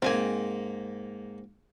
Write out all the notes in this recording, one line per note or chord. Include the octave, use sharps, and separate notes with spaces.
G#2 A#3 C4 G#4 G#5